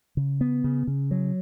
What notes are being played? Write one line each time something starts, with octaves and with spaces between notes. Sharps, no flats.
C#3
B3
C#3
C#3
F#3